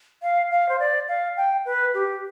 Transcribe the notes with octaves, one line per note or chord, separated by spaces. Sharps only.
F5
F5
C5
D5
F5
G5
B4
G4